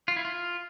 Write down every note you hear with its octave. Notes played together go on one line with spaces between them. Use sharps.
F4
E4
F4